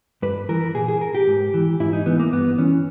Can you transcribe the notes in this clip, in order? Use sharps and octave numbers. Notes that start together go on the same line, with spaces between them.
G2 B4
E3 A#4
A#2 G#4
G#4
A#4
G4
G#2
E3
G#2 E4
D#4
E3 B3
A#3
G2 B3
E3 C#4